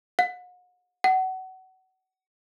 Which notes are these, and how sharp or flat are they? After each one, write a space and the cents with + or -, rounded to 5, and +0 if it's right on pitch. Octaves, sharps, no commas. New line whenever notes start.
F#5 -40
F#5 +25